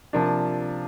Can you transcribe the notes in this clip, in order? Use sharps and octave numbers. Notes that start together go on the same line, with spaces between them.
C3 F3 A#3 D4